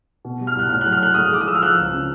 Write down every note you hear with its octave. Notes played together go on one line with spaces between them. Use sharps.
B2
G3
F6
C2 F#6
A2 F6
F#3 F#6
F6
A3 F#6
G#3 D#6 F6
G#3 D6
D#6
F3 E6
F6
F3 E6 F#6
C#2
C#3